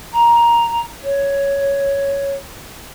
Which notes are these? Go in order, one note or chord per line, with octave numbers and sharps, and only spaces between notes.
A#5
C#5